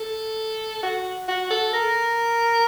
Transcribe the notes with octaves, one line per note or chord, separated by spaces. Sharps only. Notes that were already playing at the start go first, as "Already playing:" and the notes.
Already playing: A4
F#4
F#4
A4
A#4